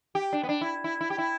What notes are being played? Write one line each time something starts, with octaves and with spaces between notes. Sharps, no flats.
G4
D4
B3
D4
E4
E4
E4
G4
E4